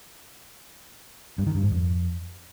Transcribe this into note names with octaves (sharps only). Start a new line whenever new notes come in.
G2
D#3
G2
G#2
F2